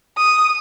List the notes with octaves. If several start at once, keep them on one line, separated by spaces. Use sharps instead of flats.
D#6